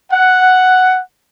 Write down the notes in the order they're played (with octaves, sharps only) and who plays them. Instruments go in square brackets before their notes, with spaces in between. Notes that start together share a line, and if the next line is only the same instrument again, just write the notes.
[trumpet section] F#5